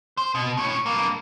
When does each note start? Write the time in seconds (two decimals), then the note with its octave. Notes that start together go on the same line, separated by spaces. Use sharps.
0.17 C5
0.35 B2
0.57 A2 C#4
0.86 G2 A#3